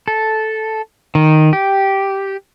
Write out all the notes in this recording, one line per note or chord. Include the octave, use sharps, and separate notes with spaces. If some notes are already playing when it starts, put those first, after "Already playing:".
A4
D#3
G4